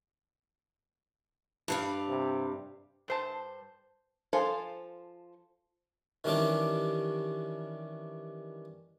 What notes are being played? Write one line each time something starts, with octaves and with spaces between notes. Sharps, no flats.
G2 G3 F5
C3
G2 C5 A5
F3 A4 C5 F5 G#5
D#3 E3 G3 C#4 D4 G4